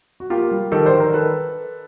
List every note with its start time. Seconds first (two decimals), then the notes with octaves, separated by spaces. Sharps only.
0.20 F#4
0.30 A#3 F4 G4
0.51 G3
0.72 D#3 G4 A4
0.86 C5 D5
0.93 D#3
1.00 A#4 C5
1.13 D#3 A4 B4